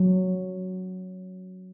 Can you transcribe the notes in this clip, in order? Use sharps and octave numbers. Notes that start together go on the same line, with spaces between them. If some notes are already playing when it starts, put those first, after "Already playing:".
Already playing: F#3